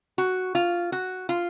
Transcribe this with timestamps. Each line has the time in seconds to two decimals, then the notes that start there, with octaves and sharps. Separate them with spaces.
0.18 F#4
0.55 F4
0.92 F#4
1.29 F4